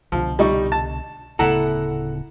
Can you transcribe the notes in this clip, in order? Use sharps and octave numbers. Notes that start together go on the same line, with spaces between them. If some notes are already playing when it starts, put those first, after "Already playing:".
C2 B2 D3 F3
G3 D#4 C#6
A5
D1 C#3 B3 E4 A4 F#5 A#5